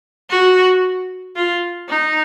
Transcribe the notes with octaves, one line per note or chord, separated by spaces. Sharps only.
F#4
F4
D#4